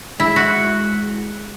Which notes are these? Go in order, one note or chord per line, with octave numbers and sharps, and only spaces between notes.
G#3 E4
F#4